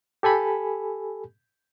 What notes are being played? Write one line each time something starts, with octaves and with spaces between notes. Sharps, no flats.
G4 A4 G#5 B5